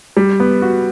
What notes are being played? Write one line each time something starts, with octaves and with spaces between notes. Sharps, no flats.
G3
B3
F#4